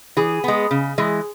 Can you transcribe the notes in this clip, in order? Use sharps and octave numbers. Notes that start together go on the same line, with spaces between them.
E3 G#4
G#3 B3
C#3
E3 G#3